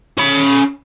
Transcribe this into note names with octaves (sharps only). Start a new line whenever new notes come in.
C#4 B5